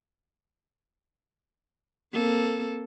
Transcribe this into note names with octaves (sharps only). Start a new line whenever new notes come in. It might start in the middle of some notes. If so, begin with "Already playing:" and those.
A#3 C4 A4